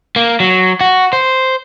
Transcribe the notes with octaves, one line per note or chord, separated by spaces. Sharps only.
A#3
F#3
F#4
C5